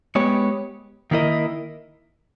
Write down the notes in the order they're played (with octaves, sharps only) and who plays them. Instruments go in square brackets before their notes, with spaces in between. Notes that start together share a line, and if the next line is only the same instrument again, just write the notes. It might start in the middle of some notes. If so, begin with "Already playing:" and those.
[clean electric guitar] G#3 B3 G4 C#5
D#3 A#3 E4 A#4 D#5